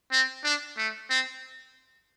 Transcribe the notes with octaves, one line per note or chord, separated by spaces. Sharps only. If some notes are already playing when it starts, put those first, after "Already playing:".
C4
D4
A3
C4